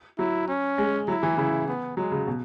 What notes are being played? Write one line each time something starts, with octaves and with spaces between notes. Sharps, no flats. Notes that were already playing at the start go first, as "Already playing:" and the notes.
F#3 E4
C#4
G#3
F#3 E4
E3
C#3 E4
B3
F#3 G#3
C#3
B2